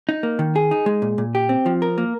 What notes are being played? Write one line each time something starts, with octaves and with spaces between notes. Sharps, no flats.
D#4
A#3
D#3
G#4
D#4
G#3
A#2
A#2
G4
C4
F3
A#4
A#3